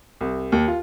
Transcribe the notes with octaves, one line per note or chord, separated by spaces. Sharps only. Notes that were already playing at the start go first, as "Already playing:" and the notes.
C2
D#2
F4